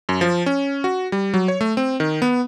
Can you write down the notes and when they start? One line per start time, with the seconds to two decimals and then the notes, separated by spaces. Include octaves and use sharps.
0.09 F#2
0.21 F3
0.46 C#4
0.84 F#4
1.12 G3
1.34 F#3
1.48 C#5
1.61 A3
1.77 C4
2.00 D#3
2.22 B3